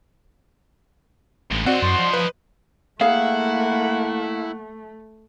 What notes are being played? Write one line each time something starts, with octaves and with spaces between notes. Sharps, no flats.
A1 G2 G#3
C4 F#4 C5 D5 D#5 F#5
F#2 C6
F3
B4
A3 A#3 E4 G#4 F5 F#5